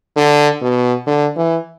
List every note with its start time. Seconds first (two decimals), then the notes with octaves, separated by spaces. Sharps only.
0.16 D3
0.62 B2
1.07 D3
1.37 E3